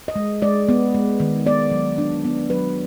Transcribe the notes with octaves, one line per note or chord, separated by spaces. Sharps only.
D#5
G#3
G#3 D5
B3
G#3
D#3
B3 D5
F#3
D4
B3
F#3 B4